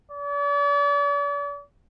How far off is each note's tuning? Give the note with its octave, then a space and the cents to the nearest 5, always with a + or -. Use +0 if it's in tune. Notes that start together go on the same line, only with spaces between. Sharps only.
D5 -40